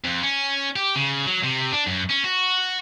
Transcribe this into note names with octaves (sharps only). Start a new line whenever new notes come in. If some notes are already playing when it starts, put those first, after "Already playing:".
F2
C#4
G4
C#3
F#3
C3
D4
F#2
C#4
F#4